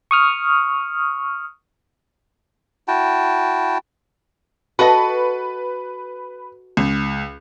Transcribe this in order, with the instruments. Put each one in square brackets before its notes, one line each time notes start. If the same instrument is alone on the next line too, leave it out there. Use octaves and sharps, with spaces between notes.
[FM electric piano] C#6 D#6 F6
[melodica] E4 F#4 G5 A5
[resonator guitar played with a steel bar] F#4 A4 D#5 [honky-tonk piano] B4
[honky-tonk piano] C#2